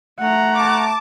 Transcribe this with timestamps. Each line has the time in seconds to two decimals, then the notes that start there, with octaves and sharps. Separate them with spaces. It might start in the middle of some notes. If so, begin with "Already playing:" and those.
0.20 A3 F#5 A#5
0.55 A5 D6